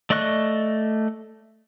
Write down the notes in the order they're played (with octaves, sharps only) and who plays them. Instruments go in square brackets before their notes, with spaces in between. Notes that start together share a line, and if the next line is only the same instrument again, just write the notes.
[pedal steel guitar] A3 D5 D#5 C#6 F#6